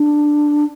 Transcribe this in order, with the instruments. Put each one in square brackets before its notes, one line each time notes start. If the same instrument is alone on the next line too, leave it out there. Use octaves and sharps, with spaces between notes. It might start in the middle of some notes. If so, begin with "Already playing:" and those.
Already playing: [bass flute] D4